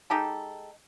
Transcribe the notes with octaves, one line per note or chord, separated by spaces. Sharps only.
G#3 D#4 G4 A4